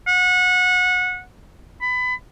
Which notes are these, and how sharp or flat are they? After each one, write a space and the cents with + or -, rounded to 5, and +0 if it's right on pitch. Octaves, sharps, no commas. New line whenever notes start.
F#5 -25
B5 +25